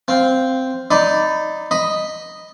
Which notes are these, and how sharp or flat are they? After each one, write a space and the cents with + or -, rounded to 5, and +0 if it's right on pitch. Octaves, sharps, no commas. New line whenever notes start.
C4 -5 F5 +0
D#4 +0 D5 +0 B5 +25
D#5 +0 B5 +0